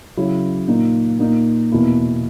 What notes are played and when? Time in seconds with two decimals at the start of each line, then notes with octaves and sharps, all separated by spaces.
0.17 C#3 F#3 C#4 E4
0.68 A#2 A#3 D#4
1.19 A#2 A#3 D#4
1.72 E2 B2 A#3 E4